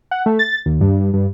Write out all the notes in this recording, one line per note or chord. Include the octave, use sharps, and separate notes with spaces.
F#5
A3
A6
D#2
G2
G2